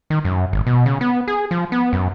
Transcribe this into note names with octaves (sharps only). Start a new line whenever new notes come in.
D#3
F#2
G#1
B2
C#3
B3
G#4
F3
B3
F#2